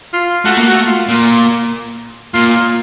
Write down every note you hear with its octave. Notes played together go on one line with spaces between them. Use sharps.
F4
A3 F#4
A#3
A3 F#4
F4
A#2
A#2 F4
F4